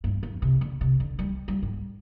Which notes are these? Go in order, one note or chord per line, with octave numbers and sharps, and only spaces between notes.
G2
F2
C3
D3
C3
D3
G3
G3
G#2